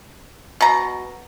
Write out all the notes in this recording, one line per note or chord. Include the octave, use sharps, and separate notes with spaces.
B2 A#5